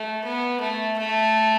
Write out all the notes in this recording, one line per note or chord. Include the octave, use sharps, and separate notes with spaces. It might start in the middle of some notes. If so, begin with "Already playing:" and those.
Already playing: A3
B3
A3
A3